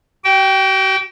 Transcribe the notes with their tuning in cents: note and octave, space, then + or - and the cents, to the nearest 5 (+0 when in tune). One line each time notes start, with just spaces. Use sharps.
F#4 +45 G5 -10